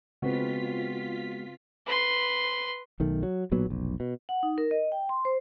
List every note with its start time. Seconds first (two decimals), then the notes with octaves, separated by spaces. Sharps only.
0.22 C#3 G#3 B3 C4 F4 F#4 B4 B6
1.87 B4 C6
3.00 B1 D#3 A3
3.23 F#3
3.52 B1 A#2 F#3 B3
3.67 F1 B1
4.00 B2
4.29 F#5
4.43 D#4
4.58 A#4
4.71 D#5
4.92 G5
5.09 C6
5.25 C5